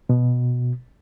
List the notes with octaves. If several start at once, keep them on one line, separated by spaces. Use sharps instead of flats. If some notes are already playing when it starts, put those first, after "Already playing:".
B2